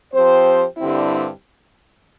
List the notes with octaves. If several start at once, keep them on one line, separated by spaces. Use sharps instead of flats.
F3 C4 G4 C5
G2 D3 G3 C4 E4